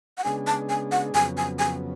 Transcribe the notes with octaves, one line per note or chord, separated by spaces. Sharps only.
F#5
C#3 G#3 B3 D4 G#4 G#5
A5
G#5
F#5
F2 C#3 F#3 B3 G#5
G#5
G#5